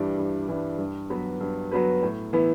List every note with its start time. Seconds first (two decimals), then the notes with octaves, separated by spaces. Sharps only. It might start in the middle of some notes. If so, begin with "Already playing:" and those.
Already playing: G2 E3 G3 D4
0.18 G2
0.48 E3 G3 D4
0.78 G2
1.10 F#3 B3 F#4 B4
1.41 G2
1.72 F#3 B3 F#4 B4
2.03 A2
2.33 E3 B3 E4